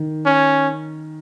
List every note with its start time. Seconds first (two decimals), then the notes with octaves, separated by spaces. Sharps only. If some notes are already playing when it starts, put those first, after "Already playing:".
Already playing: D#3
0.26 C#4